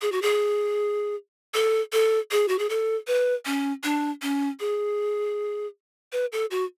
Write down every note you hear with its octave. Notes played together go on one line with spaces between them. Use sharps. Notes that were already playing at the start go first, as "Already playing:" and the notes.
G#4
F#4
G#4
A4
A4
G#4
F#4
G#4
A4
B4
C#4
D4
C#4
G#4
B4
A4
F#4